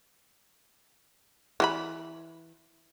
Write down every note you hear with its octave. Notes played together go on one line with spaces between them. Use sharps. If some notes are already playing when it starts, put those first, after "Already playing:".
E3 G4 B5